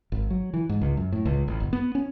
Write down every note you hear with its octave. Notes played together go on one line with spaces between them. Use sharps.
G#1
F#3
E3
G#2
C#2
F#2
A2
C#2
A1
F#1
B3
C#4